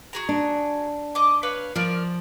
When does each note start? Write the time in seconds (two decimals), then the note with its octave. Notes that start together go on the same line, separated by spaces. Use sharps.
0.13 F#4 G#4 A#5
0.29 D4
1.15 D#5 D6
1.43 B4 C#5 F5
1.76 F3 A#4 D5 F5